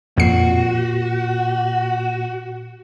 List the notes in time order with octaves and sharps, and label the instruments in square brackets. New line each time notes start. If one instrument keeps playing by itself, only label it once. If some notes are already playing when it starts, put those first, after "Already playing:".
[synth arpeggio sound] F2 C7 [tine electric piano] A#2 [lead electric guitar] F#4